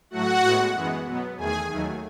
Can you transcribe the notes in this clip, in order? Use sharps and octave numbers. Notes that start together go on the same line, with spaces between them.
A2 F#3 A3 F#4 F#5
A2 G#3 B3
F#2 E3 G#3 B3
B2 F#3 B3
E2 D#3 A3 G#4 G#5
D#2 D#3 F#3 A3